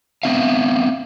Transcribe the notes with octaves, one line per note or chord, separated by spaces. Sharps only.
B3 C4 E5 F5